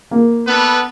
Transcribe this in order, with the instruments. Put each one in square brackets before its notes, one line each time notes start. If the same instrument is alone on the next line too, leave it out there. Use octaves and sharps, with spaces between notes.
[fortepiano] A#3
[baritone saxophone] B3 [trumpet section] D4 A4 B4